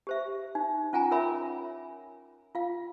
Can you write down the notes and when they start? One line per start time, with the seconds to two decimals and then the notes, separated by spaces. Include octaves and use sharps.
0.07 G4 C5 E5
0.55 D#4
0.93 C#4 F4 F#5 G#5 A#5
1.11 F4 A#4 C#5 E5 B5 D6
2.55 F4 F5